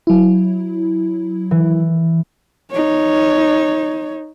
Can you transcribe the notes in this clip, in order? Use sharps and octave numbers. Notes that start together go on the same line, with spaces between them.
F#3 E4
E3
D#4 C#5